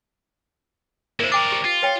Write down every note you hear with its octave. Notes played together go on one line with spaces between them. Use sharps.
A#3 E4 A#4 C5
D4 A#4 G5 D6
G4
F4
B4 C#5 G5